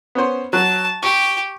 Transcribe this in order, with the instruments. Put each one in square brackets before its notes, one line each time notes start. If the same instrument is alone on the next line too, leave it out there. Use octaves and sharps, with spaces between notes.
[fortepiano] B3 C#4 C5
[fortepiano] F#3 [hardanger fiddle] A5
[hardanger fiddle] G4 [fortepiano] C#6